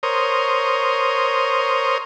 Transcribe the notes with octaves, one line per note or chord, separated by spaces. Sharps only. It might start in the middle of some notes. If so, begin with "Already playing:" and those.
A#4 C5 C#5 D#6